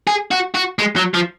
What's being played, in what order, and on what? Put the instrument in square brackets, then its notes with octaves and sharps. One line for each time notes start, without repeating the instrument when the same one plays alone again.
[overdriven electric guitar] G#4
F#4
F#4
G#3
F#3
F3